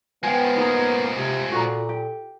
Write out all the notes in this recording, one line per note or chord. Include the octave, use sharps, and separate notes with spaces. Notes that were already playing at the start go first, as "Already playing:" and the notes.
F3 G#3 B3 G5 G#5
A#3 D#4 G#4 A#5
C3
A#2 F#4 A4 A#5
G4